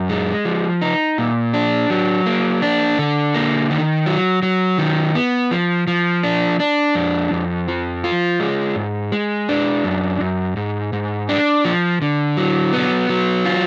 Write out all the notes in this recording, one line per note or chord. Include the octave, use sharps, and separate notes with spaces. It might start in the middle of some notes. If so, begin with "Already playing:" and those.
Already playing: F#2
G#3
F3
D#4
A#2
D4
F#3
A#3
D4
D3
A#3
D#3
F#3
F#3
D#3
B3
F3
F3
D4
D4
F2
F2
F3
F4
G#3
G#2
G#3
D4
F#2
F#2
G#2
G#2
D4
F3
D3
F#3
B3
F#3
F4